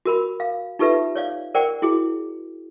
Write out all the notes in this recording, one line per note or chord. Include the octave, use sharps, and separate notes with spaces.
F#4 A#4 B5
F5
D#4 F4 G4 A4 B4 E5
C#5 D5 F5
A#4 C5 D5 F#5 G5
E4 F#4 G#4